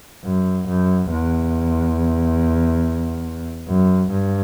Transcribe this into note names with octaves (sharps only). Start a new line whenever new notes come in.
F#2
F#2
E2
F#2
G2